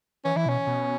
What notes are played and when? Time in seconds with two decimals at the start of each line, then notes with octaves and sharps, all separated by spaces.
0.25 E3 C#4
0.36 E3 E4
0.46 B2 C#4
0.67 B2